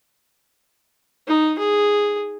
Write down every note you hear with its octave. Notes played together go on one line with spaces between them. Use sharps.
D#4
G#4